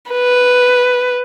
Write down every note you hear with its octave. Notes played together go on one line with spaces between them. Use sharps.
B4